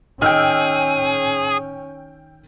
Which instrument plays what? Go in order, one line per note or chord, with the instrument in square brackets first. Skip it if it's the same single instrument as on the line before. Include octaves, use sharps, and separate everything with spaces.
[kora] D#3 [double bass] C#4 [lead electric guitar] G#4 [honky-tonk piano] G5 E6 F6